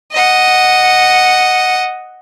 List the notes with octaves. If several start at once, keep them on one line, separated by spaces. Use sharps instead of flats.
D#5 F#5